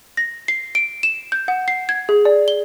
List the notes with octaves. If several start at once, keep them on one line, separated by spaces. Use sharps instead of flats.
A#6
C7
D7
E7
G6
F#5
C7
G#6
G#4
D5
G7